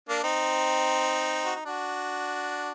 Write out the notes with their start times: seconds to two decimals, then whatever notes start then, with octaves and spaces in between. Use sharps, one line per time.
0.09 A#3 D4
0.24 C4 D#4
1.45 F#4
1.55 D#4
1.65 D4 F#4